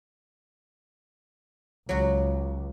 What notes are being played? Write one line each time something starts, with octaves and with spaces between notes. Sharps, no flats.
C#2 F#3 F#4